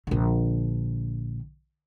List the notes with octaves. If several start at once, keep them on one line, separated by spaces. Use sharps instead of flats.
A#1 D3